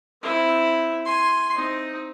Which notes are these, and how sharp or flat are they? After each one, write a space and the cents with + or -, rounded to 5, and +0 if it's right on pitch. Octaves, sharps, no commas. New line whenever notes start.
C4 -10 E4 +0
G#5 +0 C6 +0
C4 +0 D#4 +0